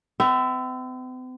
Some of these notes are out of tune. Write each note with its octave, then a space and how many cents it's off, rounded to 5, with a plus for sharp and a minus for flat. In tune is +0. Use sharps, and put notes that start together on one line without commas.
C4 -45 E5 +0